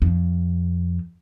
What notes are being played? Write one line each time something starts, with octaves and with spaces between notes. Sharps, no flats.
F2